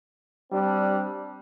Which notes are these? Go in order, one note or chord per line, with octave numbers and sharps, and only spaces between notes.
G3 C4 D4